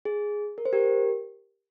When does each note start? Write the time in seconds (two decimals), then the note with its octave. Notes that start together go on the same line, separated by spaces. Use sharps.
0.05 G#4
0.58 A#4
0.65 C5
0.73 G4 A#4